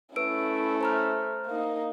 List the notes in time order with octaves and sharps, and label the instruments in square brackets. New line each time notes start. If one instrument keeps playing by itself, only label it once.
[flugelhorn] A3 [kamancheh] C#4 E4 [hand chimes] B4 E6 D7
[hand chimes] C5 A#5 F6
[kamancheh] A#3 D#4